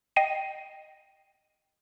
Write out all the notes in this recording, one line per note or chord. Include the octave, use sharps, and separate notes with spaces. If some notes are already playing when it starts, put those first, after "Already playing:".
D#5 G5 A#6 C7 D#7